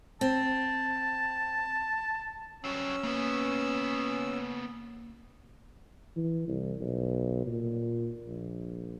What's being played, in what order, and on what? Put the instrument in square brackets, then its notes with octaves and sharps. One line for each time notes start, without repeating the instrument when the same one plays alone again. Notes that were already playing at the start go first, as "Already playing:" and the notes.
[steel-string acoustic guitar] C4 [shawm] A5
[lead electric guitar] G2 F#3 [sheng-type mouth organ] C#4 E6
[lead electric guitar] C#3 B3 [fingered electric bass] A#3
[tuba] E3
C2
B1
A#2
A#1